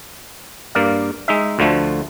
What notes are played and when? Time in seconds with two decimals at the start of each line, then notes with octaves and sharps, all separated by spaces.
0.75 G2 A#3 D5 F5
1.28 G#3 D#4 E5
1.59 D2 D3 F3 A3